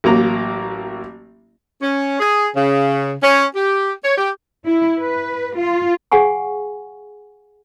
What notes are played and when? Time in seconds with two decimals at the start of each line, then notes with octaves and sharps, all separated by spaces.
0.04 A1 F#3 A#3 A#5
1.82 C#4
2.20 G#4
2.56 C#3
3.23 C#4
3.55 G4
4.03 C#5
4.18 G4
4.66 E4
4.98 B4
5.56 F4
6.12 G#4 F5 F#5 G#5 C#6